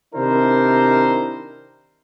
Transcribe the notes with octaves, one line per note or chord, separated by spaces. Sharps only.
C3 D#3 D4 E4 A#4 C5